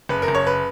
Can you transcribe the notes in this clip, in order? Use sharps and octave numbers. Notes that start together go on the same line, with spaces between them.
F#1 B4
A#4
F#1
C#5
B4